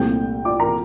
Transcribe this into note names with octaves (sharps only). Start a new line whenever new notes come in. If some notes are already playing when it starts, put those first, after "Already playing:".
Already playing: C2 A#2 A3 C4 G5 G6
D5 D6
A#4 A#5